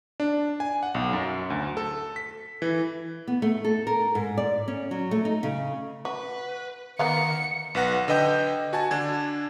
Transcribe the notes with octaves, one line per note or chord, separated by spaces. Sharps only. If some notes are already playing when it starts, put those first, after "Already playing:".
D4
G#5
F#5
B1
F#2
D2
A4
B6
E3
B3
A3
A4
A#4
G#2
D5
C#4
F#3
A3
D#4
C#3
F#4 B4
D#3 A#3 B3 F5 C#7
B1 B4 F#5 A#6
D3 B4 D#5 G5 G6
F#4 G#5 A5
D3 D4 G#6